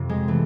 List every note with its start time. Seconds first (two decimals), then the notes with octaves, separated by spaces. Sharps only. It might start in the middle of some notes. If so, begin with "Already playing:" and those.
Already playing: F2 C3
0.09 G#3
0.28 E3 A3